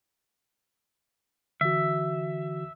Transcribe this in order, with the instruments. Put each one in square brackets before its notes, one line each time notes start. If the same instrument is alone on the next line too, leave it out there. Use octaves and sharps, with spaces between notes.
[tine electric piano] D3 E3 F#4 [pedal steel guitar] E5